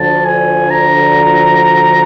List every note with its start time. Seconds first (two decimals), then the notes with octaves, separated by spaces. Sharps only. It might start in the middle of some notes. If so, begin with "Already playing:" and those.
Already playing: D2 D3 F3 A5
0.25 G#5
0.70 A#5